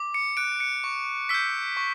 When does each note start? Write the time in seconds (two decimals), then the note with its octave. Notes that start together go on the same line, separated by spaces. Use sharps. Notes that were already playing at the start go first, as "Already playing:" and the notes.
Already playing: D6
0.14 C#7
0.37 F#6 D7
0.60 C#7
0.84 C#6
1.29 E6 G6 B6
1.77 C#6